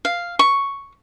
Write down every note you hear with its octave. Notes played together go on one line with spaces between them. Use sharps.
F5
C#6